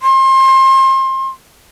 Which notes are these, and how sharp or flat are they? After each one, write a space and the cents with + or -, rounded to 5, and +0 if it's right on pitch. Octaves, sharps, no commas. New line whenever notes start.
C6 +30